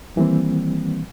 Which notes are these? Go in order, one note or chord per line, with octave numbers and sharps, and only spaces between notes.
D#3 E3 G3 A#3 C4